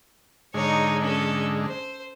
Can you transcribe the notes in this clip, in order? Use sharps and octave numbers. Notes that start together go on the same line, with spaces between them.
G#2 D3 G#3 D#4 C#5
C#4 A4
C5